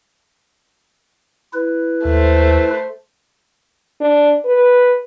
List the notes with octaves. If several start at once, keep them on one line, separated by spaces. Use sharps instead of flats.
E4 B4
D#2 A3 C5
D4
B4